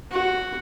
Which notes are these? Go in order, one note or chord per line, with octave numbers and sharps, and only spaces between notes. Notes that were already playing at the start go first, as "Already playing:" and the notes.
F#4